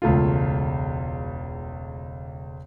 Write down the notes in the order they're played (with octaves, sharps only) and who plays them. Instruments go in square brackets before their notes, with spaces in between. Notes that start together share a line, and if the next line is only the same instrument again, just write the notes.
[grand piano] E1 C#2 A3 F4